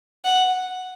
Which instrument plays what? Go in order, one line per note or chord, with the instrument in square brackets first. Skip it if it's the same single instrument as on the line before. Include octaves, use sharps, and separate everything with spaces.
[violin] F#5